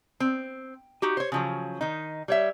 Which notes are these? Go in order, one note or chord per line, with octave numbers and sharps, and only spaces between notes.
C4
D#4 F#4 G4
C5 C#5
C#3 F3 F#3
D#3 D#4
G3 C#5 E5